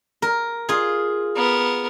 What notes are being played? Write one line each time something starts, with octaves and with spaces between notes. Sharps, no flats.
A#4
F4 G#4
B3 A#4